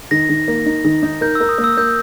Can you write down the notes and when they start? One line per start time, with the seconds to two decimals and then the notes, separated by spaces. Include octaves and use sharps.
0.11 D#3 A#6
0.30 D#3
0.48 A#3
0.66 D#4
0.85 D#3
1.03 D#4
1.21 A#4 G6
1.35 A#4 E6
1.49 D#6
1.58 A#3
1.64 E6
1.77 A#3 G6